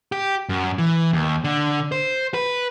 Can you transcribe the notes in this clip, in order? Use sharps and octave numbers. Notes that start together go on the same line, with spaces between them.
G4
F#2
E3
D#2
D3
C5
B4